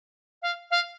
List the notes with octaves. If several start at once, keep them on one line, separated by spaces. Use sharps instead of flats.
F5
F5